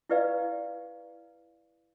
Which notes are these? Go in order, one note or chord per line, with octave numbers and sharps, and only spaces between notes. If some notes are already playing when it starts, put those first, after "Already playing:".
E4 G4 B4 D5 F5